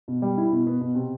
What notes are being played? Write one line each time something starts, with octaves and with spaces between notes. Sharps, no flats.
B2
G3
E4
B2
B3
B2
C3